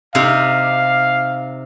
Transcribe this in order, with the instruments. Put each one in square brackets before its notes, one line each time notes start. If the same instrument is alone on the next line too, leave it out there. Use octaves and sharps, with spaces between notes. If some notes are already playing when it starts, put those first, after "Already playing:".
[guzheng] C3 D#4 G4 [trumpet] F5